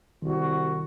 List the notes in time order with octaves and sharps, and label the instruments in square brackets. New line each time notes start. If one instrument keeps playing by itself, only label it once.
[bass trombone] C2 [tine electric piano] D#3 [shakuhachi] F#4